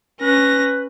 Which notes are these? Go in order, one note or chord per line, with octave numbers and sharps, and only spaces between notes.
C#4 B4 A#6